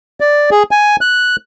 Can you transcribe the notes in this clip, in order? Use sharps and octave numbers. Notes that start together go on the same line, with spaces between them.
D5
G#4
G#5
F#6